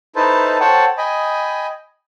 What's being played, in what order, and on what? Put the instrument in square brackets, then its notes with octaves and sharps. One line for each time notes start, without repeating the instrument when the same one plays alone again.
[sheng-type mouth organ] D#4 E4 A4 B4 C5 A5
A4 C5 C#5 F#5 G5 A5
D#5 G5 G#5 B5